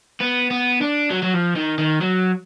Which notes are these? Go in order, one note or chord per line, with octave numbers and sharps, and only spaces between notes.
B3
B3
D4
F#3
F#3
F3
D#3
D#3
F#3